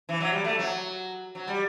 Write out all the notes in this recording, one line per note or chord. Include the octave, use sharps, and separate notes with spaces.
E3
F#3
G3
A3
F#3
F#3
G3